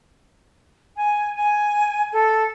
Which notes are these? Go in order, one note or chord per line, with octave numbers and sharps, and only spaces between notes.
G#5
G#5
A4